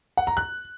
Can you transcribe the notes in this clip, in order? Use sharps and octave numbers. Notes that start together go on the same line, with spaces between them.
F#5
A#5
F#6